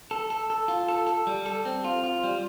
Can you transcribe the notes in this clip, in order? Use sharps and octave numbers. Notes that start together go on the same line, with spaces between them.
A4
A4
A4
F4
A4
A4
G3
A4
C4
F4
F4
G3